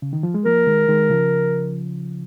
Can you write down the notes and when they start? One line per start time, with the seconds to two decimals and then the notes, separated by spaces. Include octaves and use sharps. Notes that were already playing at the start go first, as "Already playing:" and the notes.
0.02 C#3
0.13 D#3
0.23 F3
0.34 G#3
0.45 F3 A#3 A#4
0.67 D#3 G#3
0.89 D#3 G#3
1.10 C#3 F3